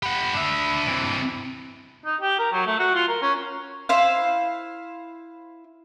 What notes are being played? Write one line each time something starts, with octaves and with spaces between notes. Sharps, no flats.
G4 F#5 B5
D4 E5
C3 E3
D#4
G4
A#4
F#3
A3
F#4
F4
A#4
C#4
E4 C5 F5